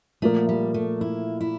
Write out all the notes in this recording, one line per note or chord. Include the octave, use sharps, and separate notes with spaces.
A#2 F3 A3 A#3
G3
A3
E4
E4